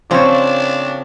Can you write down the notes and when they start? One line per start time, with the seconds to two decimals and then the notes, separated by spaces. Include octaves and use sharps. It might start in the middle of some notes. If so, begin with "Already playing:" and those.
0.11 C#3 F3 C4 D4 C#5